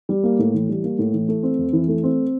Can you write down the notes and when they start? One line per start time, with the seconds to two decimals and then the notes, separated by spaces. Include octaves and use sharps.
0.09 G3
0.24 A#3
0.39 A2
0.54 E3
0.69 G3
0.84 A#3
0.99 A2
1.14 E3
1.29 A3
1.43 C4
1.58 F2
1.73 E3
1.88 A3
2.04 C4